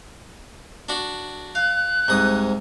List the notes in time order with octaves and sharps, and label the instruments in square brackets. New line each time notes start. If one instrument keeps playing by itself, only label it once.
[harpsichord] D4 F#4
[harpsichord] F5 [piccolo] F#6
[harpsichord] C2 G#2 D#6